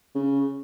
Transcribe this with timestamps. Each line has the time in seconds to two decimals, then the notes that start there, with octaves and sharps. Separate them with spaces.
0.15 C#3